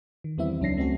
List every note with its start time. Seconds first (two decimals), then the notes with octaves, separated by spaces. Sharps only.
0.24 D#3
0.38 E2 G3 B3 C4 E4 E5
0.61 C#2 F#3 C#4 D4 A#6 C7
0.77 G3 A3 C4 C#4 F#4 A4